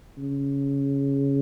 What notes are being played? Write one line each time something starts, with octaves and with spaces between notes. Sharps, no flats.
C#3